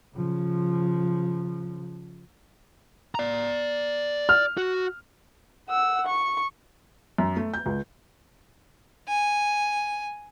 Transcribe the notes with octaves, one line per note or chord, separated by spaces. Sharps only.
C#3 F3
D5 A#5
F6
F#4
F#5 E6
C#6
F#2
A3
G6
C#2
G#5